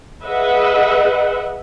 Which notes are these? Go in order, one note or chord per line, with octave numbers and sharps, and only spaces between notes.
G#4 B4 D#5 E5 F#5